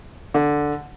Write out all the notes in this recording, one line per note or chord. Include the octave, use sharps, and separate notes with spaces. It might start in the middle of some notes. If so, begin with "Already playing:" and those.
D3